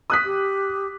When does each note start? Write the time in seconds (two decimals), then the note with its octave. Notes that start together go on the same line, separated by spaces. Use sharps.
0.10 D#6 F#6 B6
0.25 G4